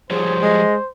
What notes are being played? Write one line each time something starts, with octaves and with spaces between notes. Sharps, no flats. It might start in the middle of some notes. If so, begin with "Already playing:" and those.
F3 G3 G#4 C5 C#5
G#3 D#5